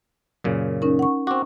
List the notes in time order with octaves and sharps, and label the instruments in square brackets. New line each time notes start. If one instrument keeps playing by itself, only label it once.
[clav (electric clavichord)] F#2 A#2 C#3
[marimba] C#4 D#4 A#4
F#5 C#6
[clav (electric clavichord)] C4 F#4 [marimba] C#6 D6